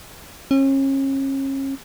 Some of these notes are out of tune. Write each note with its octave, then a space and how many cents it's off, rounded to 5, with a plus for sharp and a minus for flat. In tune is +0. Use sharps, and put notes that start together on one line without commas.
C#4 -35